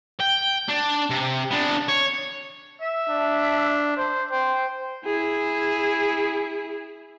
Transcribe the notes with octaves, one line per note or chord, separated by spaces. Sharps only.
G5
D4
C3
B3 D4
C#5
E5
D4
C5
C5 G5
E4 G#4